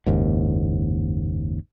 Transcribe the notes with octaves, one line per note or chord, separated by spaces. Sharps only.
F#1 D#2 G#2